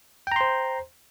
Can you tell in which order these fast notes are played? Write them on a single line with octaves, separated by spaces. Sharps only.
G5 A#5 C6 C5